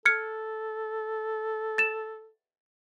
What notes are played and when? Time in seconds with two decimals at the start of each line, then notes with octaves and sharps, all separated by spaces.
0.05 A4 F6 G#6 C#7
1.78 A6 E7